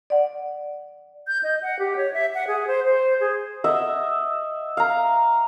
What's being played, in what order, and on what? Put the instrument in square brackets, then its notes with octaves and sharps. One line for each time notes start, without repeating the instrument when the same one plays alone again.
[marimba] D5 F#5
[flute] G6
D#5
F#5
G4
C#5
E5
F#5
G#4
C5
C5
G#4
[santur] D#5 E5 F#5
F5 A#5